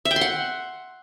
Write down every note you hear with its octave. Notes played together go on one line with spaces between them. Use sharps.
E5
G5
C6
F#5